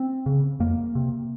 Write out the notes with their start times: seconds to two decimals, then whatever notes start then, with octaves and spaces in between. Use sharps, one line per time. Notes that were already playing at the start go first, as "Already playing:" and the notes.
Already playing: C4
0.26 C#3
0.60 F2 A#3
0.95 C3